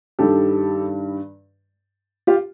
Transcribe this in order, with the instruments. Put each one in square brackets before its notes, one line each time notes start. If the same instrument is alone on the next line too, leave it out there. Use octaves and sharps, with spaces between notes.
[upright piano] G2 D#3 G3 G4 A4
F4 G4